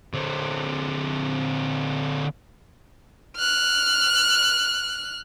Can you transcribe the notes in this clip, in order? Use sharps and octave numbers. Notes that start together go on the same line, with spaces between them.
D3 C4
F6 F#6